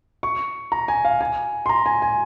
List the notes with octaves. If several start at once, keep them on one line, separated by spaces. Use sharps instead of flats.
C#6
A#5
G#5
F5
G#5
C6
A#5
G#5
G#5